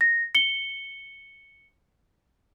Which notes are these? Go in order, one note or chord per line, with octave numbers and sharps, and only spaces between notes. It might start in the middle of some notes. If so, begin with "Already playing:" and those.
A#6
C#7 G7